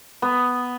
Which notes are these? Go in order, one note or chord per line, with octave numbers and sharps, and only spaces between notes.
B3